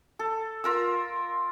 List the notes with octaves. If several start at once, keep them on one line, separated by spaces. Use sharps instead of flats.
A4
F4 A#4 E6